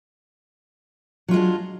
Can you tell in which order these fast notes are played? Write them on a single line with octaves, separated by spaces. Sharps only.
F#3 F4 G#3 D4